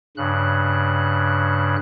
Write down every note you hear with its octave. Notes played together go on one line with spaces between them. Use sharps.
G2 C#3 F#6